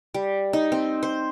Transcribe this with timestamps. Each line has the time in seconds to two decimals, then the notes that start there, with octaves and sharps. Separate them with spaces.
0.14 G3
0.53 D#4
0.72 C4
1.03 C5